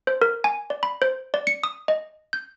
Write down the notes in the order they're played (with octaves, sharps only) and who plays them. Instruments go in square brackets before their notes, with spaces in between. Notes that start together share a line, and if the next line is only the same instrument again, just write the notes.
[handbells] C5
A#4
G#5
D5
B5
C5
D5
C#7
D#6
D#5
G6